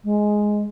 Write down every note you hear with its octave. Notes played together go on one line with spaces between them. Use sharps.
G#3